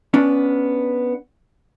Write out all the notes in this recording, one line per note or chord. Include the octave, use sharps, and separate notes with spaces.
B3 C#4 D4